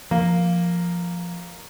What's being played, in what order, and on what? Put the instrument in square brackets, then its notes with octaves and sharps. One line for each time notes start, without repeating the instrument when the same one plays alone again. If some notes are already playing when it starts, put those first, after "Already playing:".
[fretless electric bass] F3 [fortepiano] A#3